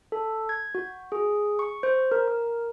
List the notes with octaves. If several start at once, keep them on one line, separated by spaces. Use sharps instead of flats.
A4
G#6
F#4
G#4
C#6
C5
A#4
A#4